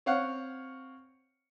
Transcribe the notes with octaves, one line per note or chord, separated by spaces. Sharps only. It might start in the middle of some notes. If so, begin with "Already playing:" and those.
C4 C#5 F5 F#5